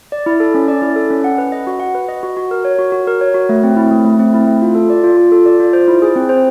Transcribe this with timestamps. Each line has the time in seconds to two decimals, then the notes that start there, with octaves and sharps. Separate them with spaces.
0.12 D5
0.26 E4
0.40 A4
0.54 C#4
0.68 D5
0.82 E4
0.96 A4
1.10 C#4
1.24 F#5
1.38 B4
1.52 D#5
1.67 F#4
1.80 F#5
1.95 B4
2.09 D#5
2.23 F#4
2.37 F#4
2.51 A#4
2.65 C#5
2.79 F#4
2.92 F#4
3.07 A#4
3.21 C#5
3.34 F#4
3.49 A3
3.64 C4
3.76 E4
3.91 A3
4.05 A3
4.19 C4
4.34 E4
4.47 A3
4.62 F4
4.75 A4
4.90 D5
5.04 F4
5.17 F4
5.32 A4
5.46 D5
5.60 F4
5.73 C5
5.88 E4
6.02 G#4
6.16 C4
6.29 C5